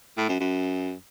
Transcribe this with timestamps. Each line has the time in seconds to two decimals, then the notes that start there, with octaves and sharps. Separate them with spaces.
0.17 A2
0.29 F#2
0.40 F#2